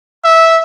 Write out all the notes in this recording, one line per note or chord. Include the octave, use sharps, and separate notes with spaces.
E5